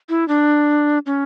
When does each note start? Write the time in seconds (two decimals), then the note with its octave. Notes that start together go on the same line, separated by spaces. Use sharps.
0.09 E4
0.28 D4
1.06 C#4